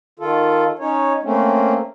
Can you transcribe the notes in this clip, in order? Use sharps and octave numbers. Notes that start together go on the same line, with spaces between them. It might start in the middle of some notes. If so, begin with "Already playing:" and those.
D#3 F4 A4
C#4 D#4 C#5
A3 A#3 C4 C#4